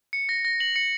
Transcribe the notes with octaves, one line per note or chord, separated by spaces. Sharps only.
C#7
A#6
A#6
F#7
C#7